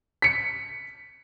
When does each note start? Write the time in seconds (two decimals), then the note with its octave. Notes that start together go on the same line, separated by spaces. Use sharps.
0.22 B6 C#7